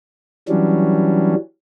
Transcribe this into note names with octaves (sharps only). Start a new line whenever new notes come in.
E3 F#3 G3 C#4 D4